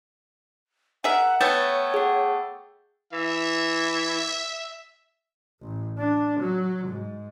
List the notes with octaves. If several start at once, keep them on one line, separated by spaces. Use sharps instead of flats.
G#4 A#4 E5 F#5
A3 B3 C#5 E5 G5 G6 A6
G#4 F#5
E3 E5
A1
D4
F#3
G#2